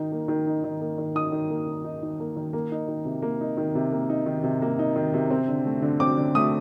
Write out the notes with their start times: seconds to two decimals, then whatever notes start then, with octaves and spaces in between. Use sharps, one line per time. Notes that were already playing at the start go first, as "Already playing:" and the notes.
Already playing: D#3 D#4
0.12 A#3
0.28 D#3
0.47 D#4
0.64 D#3
0.81 A#3
0.98 D#3
1.15 D#4 D#6
1.32 D#3
1.50 A#3
1.67 D#3
1.84 D#4
2.03 D#3
2.20 A#3
2.36 D#3
2.53 A#3
2.72 D#4
2.88 D#3
3.05 C3
3.22 A#3
3.41 D#4
3.57 D#3
3.75 C3
3.92 A#3
4.09 D#4
4.26 D#3
4.44 C3
4.62 A#3
4.79 D#4
4.96 D#3
5.14 C3
5.31 C4
5.48 D3
5.65 A3
5.82 D3
6.00 C4 D6
6.17 D3
6.35 A3 D#6